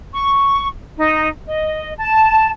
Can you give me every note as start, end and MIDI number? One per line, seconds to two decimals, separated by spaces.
0.13 0.68 85
0.97 1.28 63
1.47 1.91 75
1.99 2.49 81